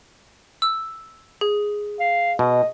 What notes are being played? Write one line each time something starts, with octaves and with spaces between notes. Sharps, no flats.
E6
G#4
F5
B2 D#5